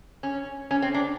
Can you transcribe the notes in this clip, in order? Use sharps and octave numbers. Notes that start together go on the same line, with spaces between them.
C#4
C#4
C4
D4